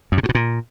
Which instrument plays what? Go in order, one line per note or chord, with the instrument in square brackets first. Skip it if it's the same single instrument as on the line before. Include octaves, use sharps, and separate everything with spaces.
[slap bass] F#2
C3
A2
B2
A#2